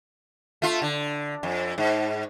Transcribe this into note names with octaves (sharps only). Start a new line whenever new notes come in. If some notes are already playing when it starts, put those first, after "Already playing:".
A3 F4
D3
F2
G#2